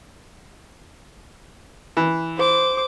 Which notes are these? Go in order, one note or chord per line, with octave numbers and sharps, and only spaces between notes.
E3
C5 D6